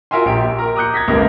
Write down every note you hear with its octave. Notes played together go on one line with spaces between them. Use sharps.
F4 F#4 A#4 E5 G#5 C6
A#1 G4 D7
A#4 A#5
A#5 D6 D#6 F#6 G6 C#7
G#6 A#6 B6
G1 C#2 G3 A#3 A#4